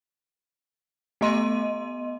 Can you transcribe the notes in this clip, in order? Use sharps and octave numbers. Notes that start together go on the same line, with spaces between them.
A3 B3 D#5 C6 D#7